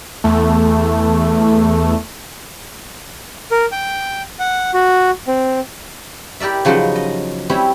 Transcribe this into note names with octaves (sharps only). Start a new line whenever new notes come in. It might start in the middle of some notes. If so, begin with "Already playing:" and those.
E2 A3
A#4
G5
F#5
F#4
C4
E4 G4 A#4 D5 E5
C#3 F3 F#3 G#3 D#4 B4
D#5
G3 C4 C#4 E4